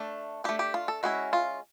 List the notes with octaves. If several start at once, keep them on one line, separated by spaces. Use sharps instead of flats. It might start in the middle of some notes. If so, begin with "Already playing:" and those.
Already playing: A3 D4
A3 D4 G4
G4
F4
A4
G#3 C#4 E4 F#4
F4